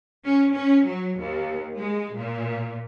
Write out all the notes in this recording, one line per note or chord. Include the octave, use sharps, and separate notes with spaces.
C#4
C#4
F#3
D#2
G#3
A#2